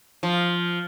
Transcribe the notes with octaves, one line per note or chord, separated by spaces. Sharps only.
F3